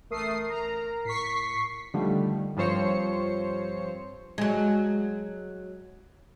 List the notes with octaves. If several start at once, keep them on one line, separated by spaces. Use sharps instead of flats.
A1 A3 A#4 D#6 C7
A#5
A2 C#6 B6 C7
D3 D#3 F3 G3 A3
G2 F3 C4 C5 C#5 C#7
F#3 G#3